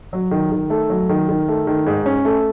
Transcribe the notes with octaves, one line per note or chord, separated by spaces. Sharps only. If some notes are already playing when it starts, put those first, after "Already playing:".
F#3
D#3
D#3
A3
F#3
D#3
D#3
A3
D#3
G#2
C#4
A3